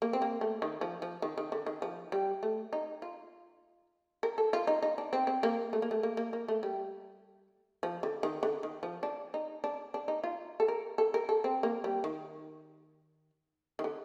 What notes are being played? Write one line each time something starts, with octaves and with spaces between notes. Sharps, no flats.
A#3
C4
A#3
A3
D#3
F3
F3
D#3
D#3
D3
D#3
F3
G3
A3
D#4
F4
A#4
A4
F4
D#4
D#4
D4
C4
C4
A#3
A3
A#3
A3
A#3
A#3
A#3
A3
G3
F3
D3
D#3
D3
D#3
F3
D4
D#4
D4
D4
D#4
F4
A4
A#4
A4
A#4
A4
C4
A#3
G3
D#3
D#3
D3